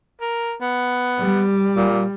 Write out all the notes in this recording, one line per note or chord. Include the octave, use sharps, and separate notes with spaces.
A#4
B3
G3
A#2